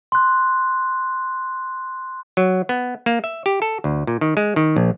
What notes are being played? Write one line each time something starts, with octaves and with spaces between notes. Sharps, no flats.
C6 F#6
F#3
B3
A#3
E5
G4
A4
D2
A#2
D#3
G#3
D#3
A#1